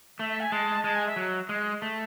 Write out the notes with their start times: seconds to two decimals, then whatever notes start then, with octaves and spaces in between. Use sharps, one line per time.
0.19 A3 E5
0.29 E5
0.40 G#5
0.52 G#3 A5
0.84 G#3 A5
0.95 G#5
1.06 E5
1.16 F#3
1.49 G#3
1.82 A3